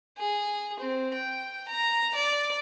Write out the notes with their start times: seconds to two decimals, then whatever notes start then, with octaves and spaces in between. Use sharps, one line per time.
0.18 G#4
0.80 C4
1.14 G5
1.68 A#5
2.15 D5